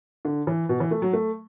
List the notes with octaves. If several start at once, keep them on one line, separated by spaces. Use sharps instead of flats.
D3
E3
B2
E3
A3
F#3
A3